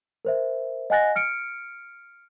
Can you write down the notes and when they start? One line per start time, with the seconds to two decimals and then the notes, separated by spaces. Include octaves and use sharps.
0.25 A#4 C5 E5
0.90 D#5 F#5 G#5 F#6 A6 A#6
1.16 F6 C#7 D7